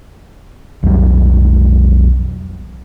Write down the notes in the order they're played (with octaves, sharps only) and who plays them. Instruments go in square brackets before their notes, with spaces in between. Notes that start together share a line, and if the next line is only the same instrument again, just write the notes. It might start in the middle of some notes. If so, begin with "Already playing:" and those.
[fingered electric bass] B1 F2 F#3 G3